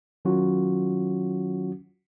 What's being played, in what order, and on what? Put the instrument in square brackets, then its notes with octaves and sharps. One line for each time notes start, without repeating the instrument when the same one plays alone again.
[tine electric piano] D#3 F#3 C#4 F4 F#4